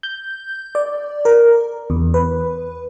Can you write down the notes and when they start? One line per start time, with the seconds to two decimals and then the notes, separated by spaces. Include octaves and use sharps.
0.03 G6
0.75 D5
1.25 A#4
1.90 E2
2.14 B4